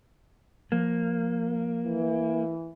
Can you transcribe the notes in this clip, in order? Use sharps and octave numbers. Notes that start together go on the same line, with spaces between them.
F3 A#3
E3